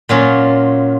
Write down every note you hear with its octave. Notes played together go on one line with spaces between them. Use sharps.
A#2 F#3 C#4 F4